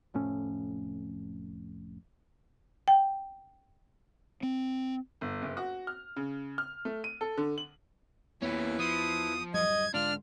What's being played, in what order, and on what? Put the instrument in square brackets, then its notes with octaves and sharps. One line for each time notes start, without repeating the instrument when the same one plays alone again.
[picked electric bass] F1 F2 A2 C#4
[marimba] G5
[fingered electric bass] C4
[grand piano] G1
F#1
F#4
F6
C#3
F6
A3
D#7
A4
D3
F#7
[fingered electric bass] E2 B3 [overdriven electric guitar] A#2 C#4 [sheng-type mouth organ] E4 B4
[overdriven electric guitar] F3 [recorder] D#6
[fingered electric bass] D1 F#2 G3 [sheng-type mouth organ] D#5 [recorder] G#6
[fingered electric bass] G#2 D3 G#3 [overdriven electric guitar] D4 [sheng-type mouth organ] F4 [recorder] F6